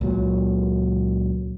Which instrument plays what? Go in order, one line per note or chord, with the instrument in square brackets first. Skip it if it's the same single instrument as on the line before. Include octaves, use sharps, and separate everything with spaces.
[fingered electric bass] C#2 A#2 F#3